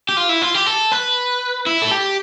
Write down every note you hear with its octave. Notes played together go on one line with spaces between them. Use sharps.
G4
F4
E4
F4
G4
A4
B4
E4
A4
G4